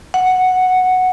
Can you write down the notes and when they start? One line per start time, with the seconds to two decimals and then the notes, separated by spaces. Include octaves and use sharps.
0.14 F#5